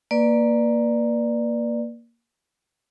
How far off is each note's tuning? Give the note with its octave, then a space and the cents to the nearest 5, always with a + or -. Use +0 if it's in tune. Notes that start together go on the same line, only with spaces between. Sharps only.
A#3 +0 B4 -20 D5 +10